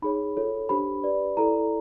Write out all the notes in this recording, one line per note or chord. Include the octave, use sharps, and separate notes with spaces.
D#4 G#4 C#5 B5
F4 A4 C#5
D4 G4 C5 B5
G4 B4 D5
E4 A4 D5 A#5